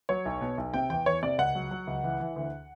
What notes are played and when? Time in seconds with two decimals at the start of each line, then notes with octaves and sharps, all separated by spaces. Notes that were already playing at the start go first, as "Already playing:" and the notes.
0.09 F#3 C#5
0.25 B1
0.41 B2
0.58 B1
0.74 C3 G5
0.90 E2 G5
1.06 E2 C#5
1.23 C3 D5
1.38 C#2 F#5
1.55 F#3
1.71 F#3
1.87 C#2
2.04 E3
2.20 E3
2.36 D2